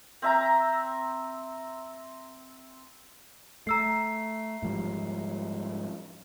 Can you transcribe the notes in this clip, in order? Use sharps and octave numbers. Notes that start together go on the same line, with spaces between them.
C4 E5 A#5
A3 A#5 E6 C7
G#2 F3 G3